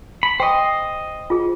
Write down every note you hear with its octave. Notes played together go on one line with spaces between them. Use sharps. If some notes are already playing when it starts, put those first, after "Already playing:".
B5
C5 D#5 G5 C#6
F4 G#4